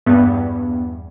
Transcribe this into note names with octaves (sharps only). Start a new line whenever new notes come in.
E2 G2 B3